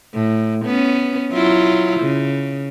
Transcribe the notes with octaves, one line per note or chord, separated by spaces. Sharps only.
A2
B3 C#4
F#3 E4 F4
C#3